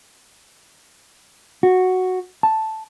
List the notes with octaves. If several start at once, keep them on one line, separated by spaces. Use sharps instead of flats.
F#4
A5